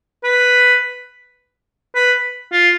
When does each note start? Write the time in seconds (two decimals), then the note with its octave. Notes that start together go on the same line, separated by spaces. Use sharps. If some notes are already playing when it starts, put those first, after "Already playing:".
0.24 B4
1.95 B4
2.52 F4